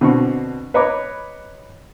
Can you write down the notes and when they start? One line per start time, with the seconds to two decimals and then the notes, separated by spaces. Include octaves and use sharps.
0.01 B2 D3 C4 D4 C#6
0.74 B4 C#5 D#5 A#5 B5 D6